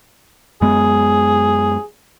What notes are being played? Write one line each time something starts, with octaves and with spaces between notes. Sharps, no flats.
F#2 G#3 B3 G#4